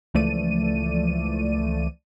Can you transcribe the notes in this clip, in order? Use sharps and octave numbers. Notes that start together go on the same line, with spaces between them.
C#2 E3 F3 A3 D5 D#7